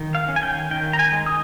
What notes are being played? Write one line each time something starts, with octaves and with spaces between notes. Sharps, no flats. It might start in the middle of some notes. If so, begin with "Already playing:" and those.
Already playing: D#3
F5
C#4
G#5
G5
D#3 G5
A#5
G#5
G#3
D#6